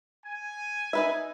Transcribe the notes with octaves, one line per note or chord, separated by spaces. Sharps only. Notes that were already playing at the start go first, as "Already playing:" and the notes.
G#5
D#4 B4 E5